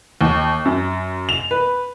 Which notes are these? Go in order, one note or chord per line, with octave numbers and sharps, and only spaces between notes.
D#2
F#2
F7
B4